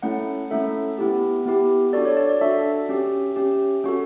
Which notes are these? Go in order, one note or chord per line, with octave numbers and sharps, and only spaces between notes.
A3 C#4 E4 A4 F#5
A3 C#4 E4 A4 E5
B3 E4 G4
B3 E4 G4
D4 F#4 A4 D5
C#5
D5
D5
D4 F#4 A4 E5
C#4 G4
C#4 G4
C#4 F#4 A4